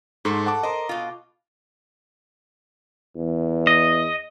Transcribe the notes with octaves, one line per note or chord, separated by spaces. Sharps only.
G#2 A3 A4 C5
F#5 A5 D6
A#4 C5 D#5
B2 F4
E2
D#5